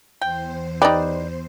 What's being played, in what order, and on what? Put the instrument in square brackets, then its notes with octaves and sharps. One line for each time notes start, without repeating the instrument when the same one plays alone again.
[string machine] E2 C5 [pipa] G5
[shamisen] D#4 G4 [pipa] B4 D5